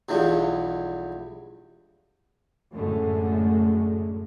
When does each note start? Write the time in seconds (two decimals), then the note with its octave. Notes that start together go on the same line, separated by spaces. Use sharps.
0.09 B1 E2 G2 F3
2.72 F#2 A2 D3 G#3 A3